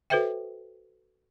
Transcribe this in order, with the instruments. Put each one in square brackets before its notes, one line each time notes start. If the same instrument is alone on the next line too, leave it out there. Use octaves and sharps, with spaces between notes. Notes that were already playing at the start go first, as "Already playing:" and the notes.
[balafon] F#4 A4 B4 C5 E5 G5